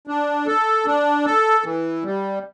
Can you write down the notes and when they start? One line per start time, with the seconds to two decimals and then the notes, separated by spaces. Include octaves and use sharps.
0.07 D4
0.47 A4
0.86 D4
1.25 A4
1.64 E3
2.04 G3